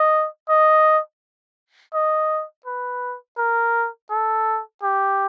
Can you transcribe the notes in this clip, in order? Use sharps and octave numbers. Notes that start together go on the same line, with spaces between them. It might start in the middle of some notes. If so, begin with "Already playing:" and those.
Already playing: D#5
D#5
D#5
B4
A#4
A4
G4